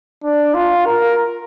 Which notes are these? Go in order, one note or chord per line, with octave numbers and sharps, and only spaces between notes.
D4
F4
A#4